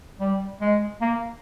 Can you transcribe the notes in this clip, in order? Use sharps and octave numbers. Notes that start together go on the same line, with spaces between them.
G3
G#3
A#3